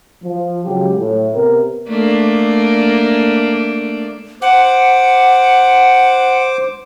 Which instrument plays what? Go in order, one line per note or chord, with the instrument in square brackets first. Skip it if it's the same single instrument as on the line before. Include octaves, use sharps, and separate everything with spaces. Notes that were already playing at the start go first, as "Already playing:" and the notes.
[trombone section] F3
C#3 F#3 G#3 F4 G4
A2
C3 B3 A#4
[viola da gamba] A3 A#3 D4
[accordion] C5 D6 [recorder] F#5